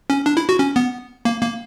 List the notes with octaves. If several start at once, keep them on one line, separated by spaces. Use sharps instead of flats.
C#4
D4
E4
F#4
C#4
B3
A#3
A#3